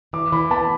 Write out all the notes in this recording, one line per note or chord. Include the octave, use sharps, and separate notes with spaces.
E3 D6
E3 B5
B3 A5